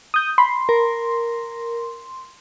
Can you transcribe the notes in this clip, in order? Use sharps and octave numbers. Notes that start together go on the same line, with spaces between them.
D#6 G6
B5 C6
A#4